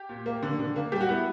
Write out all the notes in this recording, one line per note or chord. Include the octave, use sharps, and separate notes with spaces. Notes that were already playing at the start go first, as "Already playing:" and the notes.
Already playing: G4
A#2
A#3
D3
D3
A#3
G3 G4
F#4
B3 E4